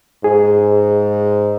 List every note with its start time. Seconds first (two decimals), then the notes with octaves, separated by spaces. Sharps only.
0.24 G#2 G#4